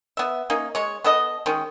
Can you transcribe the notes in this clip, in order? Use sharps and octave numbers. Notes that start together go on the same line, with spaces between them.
B3 E5
A#3 C#4 D#4
G#3 C#5
B3 A4 D#5
D#3 G#3 C#4